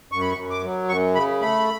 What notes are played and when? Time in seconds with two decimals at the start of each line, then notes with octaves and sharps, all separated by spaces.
0.12 F#2 C#6
0.21 B5
0.31 C#6
0.37 F#2
0.50 D6
0.64 F#3
0.89 F#2 C#6
1.15 C#3 B5
1.41 A3 B5